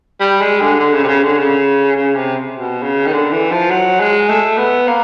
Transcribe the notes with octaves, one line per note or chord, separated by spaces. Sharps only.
G3
G#3
D3
D3
C#3
C3
C#3
D3
C#3
C#3
C3
B2
C#3
D#3
D3
E3
F3
F#3
G#3
A3
B3
A#3